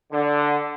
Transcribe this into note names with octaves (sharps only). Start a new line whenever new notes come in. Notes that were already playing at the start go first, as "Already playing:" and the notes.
D3